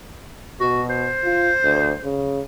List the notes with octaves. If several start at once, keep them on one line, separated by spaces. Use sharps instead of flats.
B2 F#4
C5
F4
D2
C#3